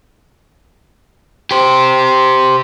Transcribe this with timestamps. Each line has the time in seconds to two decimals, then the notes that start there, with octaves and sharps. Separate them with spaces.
1.51 G4 C5